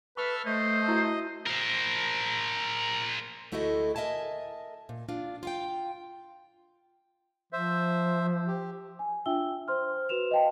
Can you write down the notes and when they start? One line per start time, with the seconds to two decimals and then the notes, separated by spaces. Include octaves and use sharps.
0.17 A4 B4 E5 C#6 F6
0.46 A3 C5 D#5
0.88 E4 F#4 E5
1.46 A#4 C5
3.52 D2 A3 E4 F#4 A4 D#5
3.96 A#4 D#5 E5 G#5 A5
4.89 A#2
5.09 D4 F4
5.43 F4 F5 G5
7.53 F3 C5 E5
8.47 G4
8.99 G#5
9.26 D4 F4 E5 G5 E6 G7
9.68 C5 C6 F6
10.09 F#4 B4 E7 F7
10.31 D#5 F5 G5 A5